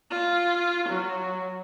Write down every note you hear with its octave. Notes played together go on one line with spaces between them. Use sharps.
F4
F#3